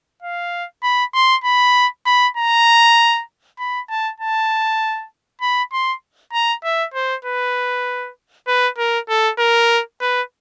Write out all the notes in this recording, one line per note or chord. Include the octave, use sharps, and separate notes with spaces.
F5
B5
C6
B5
B5
A#5
B5
A5
A5
B5
C6
A#5
E5
C5
B4
B4
A#4
A4
A#4
B4